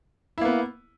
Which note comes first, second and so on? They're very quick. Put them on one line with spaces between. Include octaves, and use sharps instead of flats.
E4 A#3 B3